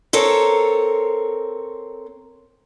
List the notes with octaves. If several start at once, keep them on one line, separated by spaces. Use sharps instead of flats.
C4 A4 A#4 C#5